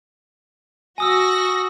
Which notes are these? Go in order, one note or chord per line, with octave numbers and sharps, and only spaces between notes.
F#4 G#5 D#6 E6 A#6